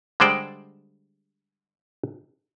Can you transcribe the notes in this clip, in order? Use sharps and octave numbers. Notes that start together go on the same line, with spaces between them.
D3 G3 G#3 C5 D5 G5